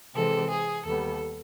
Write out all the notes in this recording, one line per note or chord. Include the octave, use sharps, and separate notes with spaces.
C3 E3 G#3 C4 A4
G#4
D#2 D#3 G3 B3 A4